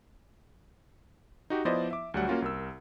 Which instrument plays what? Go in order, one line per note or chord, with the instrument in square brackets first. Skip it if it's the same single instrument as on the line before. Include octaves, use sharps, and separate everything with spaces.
[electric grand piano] D#4 F#4 G4
F3 B3 E4 C5 D5 D#5
E5 D6
D2 F#3 G3 F#5
A#3 C#4 F4 F#4
C2 A#4 E6